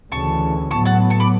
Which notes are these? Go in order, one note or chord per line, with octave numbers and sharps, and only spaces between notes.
D2 C#3 E3 A5 C#6
A2 F#3 B3 A5 C#6
F#5 A5
A5 C#6
B5 D6